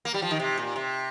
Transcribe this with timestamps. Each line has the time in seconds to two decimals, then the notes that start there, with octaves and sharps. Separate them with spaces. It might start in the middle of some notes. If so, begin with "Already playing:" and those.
0.05 A#3
0.14 G3
0.22 F3
0.31 D#3
0.40 C3
0.57 A#2
0.76 C3